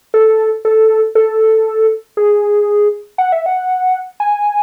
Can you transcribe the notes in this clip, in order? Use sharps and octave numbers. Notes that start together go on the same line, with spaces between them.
A4
A4
A4
G#4
F#5
E5
F#5
G#5